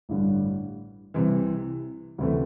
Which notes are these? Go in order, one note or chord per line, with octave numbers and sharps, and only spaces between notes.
A1 G2 D3 G3
C2 C3 E3
D2 C3 E3 A3